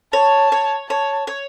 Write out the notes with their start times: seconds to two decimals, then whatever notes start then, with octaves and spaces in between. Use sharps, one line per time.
0.13 C#5 A5
0.52 C#5
0.89 C#5 A5
1.27 C#5